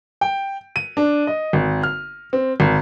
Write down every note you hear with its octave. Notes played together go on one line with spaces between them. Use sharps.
G5
D#7
D4
D#5
G#1
F6
C4
G#1